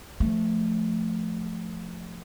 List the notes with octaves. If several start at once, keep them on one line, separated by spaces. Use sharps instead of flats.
F3 A3